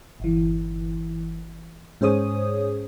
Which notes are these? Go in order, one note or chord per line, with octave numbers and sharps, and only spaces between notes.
G1 E3
G#2 C#4 G#4 C5 C#5 D#6